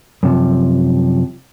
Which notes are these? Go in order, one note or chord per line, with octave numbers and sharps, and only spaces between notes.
F#2 C3 F3